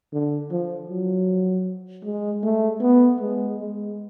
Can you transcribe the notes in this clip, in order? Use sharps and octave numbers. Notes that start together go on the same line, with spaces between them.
D3
F3
F#3
G#3
A3
B3
G#3
G#3